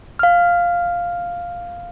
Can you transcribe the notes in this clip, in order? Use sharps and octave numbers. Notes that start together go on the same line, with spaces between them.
F5 F6